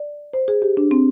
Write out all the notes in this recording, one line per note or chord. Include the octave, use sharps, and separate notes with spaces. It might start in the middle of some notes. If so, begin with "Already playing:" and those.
Already playing: D5
C5
G#4
G4
D4
C4